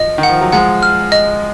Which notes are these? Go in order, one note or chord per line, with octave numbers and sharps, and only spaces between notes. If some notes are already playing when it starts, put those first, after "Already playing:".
Already playing: F3 D#5
D#3
F#5
F3
F#3
F3 G#3 F#5
F6
D#5